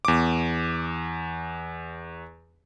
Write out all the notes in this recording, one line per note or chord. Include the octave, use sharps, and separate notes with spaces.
E2 D6